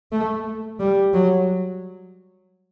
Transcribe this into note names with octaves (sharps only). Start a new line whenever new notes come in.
A3
G3
F#3